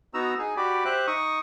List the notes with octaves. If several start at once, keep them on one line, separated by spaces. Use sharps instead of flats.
B3 D#4 F#4 A#5 E6
D#4 G#4
F#4 G4 D5 B5 D6
G4 C5 E5 F#6
D#4 C#6 D#6